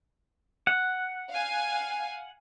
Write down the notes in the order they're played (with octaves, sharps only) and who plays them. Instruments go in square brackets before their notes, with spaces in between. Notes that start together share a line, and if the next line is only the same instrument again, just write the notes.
[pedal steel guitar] F#5
[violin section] F5 G#5